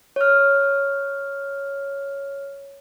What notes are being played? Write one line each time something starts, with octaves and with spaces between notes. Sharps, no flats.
C#5 F6